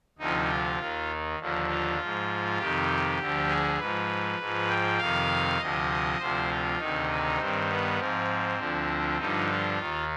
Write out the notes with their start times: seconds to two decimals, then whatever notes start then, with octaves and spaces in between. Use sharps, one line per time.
0.18 D2 C3 F3 D#4
0.49 F4
0.79 D#2 D#3
1.39 D#2 D3 F3
1.69 F4
1.99 G#2 F3
2.58 F2 C3 D#3 G4
3.18 D2 D3 F3
3.48 G#4
3.79 G#2 F3 B4
4.39 G#2 F3
4.69 G5
4.98 F2 C3 D#3 F5
5.59 D2 C3 F3 D#5
6.19 D2 C3 F3 C5
6.49 F4
6.78 D2 C3 D#3 D#4
7.38 G2 D#3 C4
7.69 B3
7.98 G#2 F3 C4
8.58 D2 D3 F3
9.18 G2 D3 F3 D#4
9.48 F4
9.79 D#2 D#3